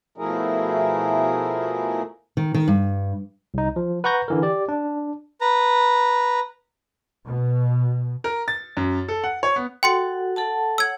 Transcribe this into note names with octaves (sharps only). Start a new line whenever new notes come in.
B2 F3 A3 E4 G#4 A#4
D#3
D#3
G2
C2 D#4
F3
B4 F#5 A#5 C#6 G6 A#6
D3 E3 A#4
G4 D5
D4
B4 A#5
B2
A#4
A6
F#2
A4
F#5
C#5
B3
F#4 A4 F#5 G5 C6 C#7
A4 F#5 A5
C#5 F#5 E6 G#6